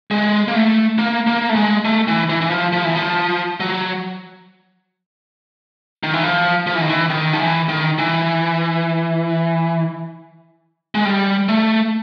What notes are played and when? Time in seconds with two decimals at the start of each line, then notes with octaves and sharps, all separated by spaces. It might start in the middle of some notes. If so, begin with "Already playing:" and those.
0.11 G#3
0.48 A#3
0.55 A3
0.98 A#3
1.27 A#3
1.49 A3
1.56 G#3
1.85 A3
2.08 E3
2.29 E3
2.41 E3
2.50 F3
2.73 F3
2.85 E3
2.96 F3
3.60 F#3
6.03 D#3
6.14 E3
6.23 F3
6.67 F3
6.75 E3
6.81 D#3
6.90 E3
7.10 D#3
7.33 F3
7.40 E3
7.69 D#3
7.98 E3
10.95 G#3
11.05 G3
11.49 A3